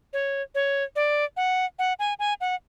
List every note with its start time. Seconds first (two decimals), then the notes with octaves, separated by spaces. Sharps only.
0.13 C#5
0.55 C#5
0.96 D5
1.37 F#5
1.79 F#5
1.99 G#5
2.19 G#5
2.41 F#5